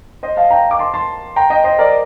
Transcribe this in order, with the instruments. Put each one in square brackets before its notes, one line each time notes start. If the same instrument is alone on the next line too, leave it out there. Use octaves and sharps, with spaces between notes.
[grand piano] C5 D#5
F5 A5
G5 A#5
D6
A5 C6
A5 C6
G5 A#5
D#5 G5
C5 D#5
A#4 D5